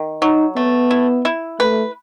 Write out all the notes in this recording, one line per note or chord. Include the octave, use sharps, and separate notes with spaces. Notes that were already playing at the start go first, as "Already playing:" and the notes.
Already playing: D#3
F#3 D#4
A3 B3
E4
E4
A3 B4